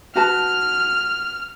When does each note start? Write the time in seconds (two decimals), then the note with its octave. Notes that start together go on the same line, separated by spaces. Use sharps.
0.15 F#4 B4 A5 F6